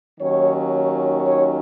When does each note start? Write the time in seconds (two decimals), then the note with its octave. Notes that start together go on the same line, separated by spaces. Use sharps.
0.19 D#2 D#3 F#3 C#4 C#5
1.25 C#5